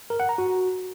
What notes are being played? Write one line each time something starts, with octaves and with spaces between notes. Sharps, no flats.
A#4
F#5
A#5
F#4